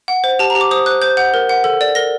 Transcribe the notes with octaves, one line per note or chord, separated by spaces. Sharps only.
F#5
C5
G4 A5
A#5
G4
D6
C5 D#6
C5 F#6
C5 G6
F#5 G6
A#4
F#5
A4
D5
A#4 A#6